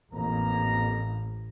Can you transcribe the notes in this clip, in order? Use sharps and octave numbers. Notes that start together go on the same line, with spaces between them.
A1 F2 A#3 A#5